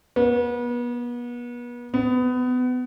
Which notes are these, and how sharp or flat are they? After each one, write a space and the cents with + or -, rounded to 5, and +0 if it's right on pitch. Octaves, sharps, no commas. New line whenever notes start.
B3 -35
B3 +25